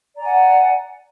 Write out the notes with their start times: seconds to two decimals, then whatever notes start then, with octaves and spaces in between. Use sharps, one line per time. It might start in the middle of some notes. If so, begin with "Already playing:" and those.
0.14 D5
0.18 A#5
0.22 G#5
0.25 F#5